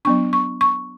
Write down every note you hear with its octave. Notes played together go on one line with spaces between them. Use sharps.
F#3 B3 D4 C#6
C#6
C#6